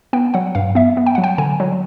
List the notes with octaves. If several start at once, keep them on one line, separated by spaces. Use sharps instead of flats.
B3 G5
F#3 F#5
G2 F5
B3 E5
B3
G5
F#3 F#5
G5
D3 G#5
F#3